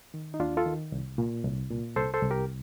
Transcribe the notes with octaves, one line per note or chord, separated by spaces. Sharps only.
D#3
D#4
D#2 D4 F4
F4 A4
D#3
C2
A#2
C2
A#2
C2 A4 C5
A4 C5
C2
G4 A#4